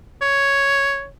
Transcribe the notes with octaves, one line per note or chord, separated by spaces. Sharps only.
C#5